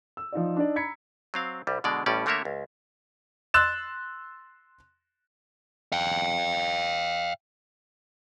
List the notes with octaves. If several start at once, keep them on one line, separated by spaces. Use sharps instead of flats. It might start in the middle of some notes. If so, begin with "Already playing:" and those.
E6
F3 D#4 F4 D5
D4 D#4 D5
A#5 B5 G#6 B6 C#7
F#3 C4 F5
C2 G3
B2 D3 G#3 D5
A1 A2 G3 C#4 D5
D3 A3 A#3 A#4 C#5 E5
C#2
C6 E6 F#6 A6 E7
F5 G5